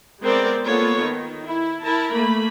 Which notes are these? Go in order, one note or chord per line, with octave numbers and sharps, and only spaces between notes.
G#3 B3 C4 A#4 D5
A#3 B3 F4 A4 C#5
D#3
E4
E4 A#4 A5
A3 A#3 B5